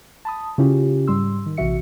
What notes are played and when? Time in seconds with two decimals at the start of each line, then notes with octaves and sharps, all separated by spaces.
0.25 A5 B5 D#6
0.58 C#3 C#4 E4 F4 G4
1.08 G#2 G3 C6 E6
1.46 D#3
1.57 A#1 C3 E3 F#4 E5 C#7